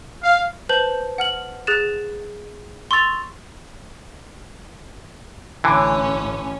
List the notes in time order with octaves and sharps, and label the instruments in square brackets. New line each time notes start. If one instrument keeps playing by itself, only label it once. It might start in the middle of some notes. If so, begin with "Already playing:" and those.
[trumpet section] F5
[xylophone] B4 C5 A5 G6 F#7
F#5 F6 F#7
G#4 F#6 A6 E7
C6 C#6 E6 A6 F7
[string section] A1 C#4 [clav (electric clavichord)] D3 E3